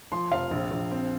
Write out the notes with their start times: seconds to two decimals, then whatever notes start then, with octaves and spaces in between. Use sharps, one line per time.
0.12 F3 C6
0.31 F1 F5
0.51 A#1
0.71 A#1
0.91 C4